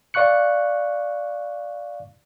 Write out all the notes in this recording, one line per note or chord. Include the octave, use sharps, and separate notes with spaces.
D5 F5 C#6 F#6 C#7